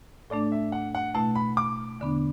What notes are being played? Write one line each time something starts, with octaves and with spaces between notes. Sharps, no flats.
A2 A3 D4 D5
E5
F#5
F#5
B2 A3 E4 A5
B5
D6
E2 D3 B3 D4